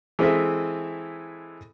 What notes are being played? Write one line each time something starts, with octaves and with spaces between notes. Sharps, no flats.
E3 G#3 C4 G#4 A4 E5